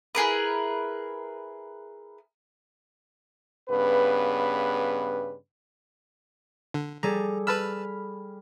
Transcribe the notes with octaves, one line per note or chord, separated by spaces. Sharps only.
E4 G#4 A#4 B4
G2 C#3 B3 B4
D3
G3 G#4 A4 A#5
B4 A5 B5 E6 F6